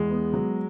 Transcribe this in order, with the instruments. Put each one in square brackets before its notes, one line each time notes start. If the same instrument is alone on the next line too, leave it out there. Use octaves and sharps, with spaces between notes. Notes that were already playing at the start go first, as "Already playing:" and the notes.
Already playing: [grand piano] E2 [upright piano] G#3
[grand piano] B3
F#3